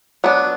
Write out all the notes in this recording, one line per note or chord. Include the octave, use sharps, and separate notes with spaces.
F#3 B3 D4